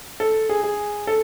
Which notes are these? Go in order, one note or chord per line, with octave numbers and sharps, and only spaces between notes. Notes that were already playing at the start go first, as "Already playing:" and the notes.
A4
G#4
G#4
A4